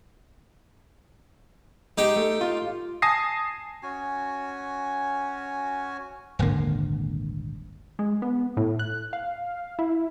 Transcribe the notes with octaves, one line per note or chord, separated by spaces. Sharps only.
G#3 D#4 G4 G5
A3
F4
G#5 A5 D#6 A#6 C7
C#4 F#4 G#5
D#1 G#1 D3 A#3
G#3
B3
A2
F#6
F5
E4